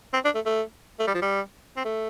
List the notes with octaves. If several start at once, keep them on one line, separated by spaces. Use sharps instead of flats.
C4
D4
A3
A3
A3
G3
F3
G3
C4
A3